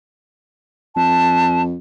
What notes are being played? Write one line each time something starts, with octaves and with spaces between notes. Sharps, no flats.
F2 A5